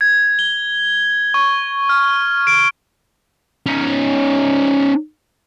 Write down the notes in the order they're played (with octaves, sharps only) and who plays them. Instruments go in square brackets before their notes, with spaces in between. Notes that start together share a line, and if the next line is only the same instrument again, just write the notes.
[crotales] G#6
G7
C#6
F6
D7
[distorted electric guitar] C#4 D#4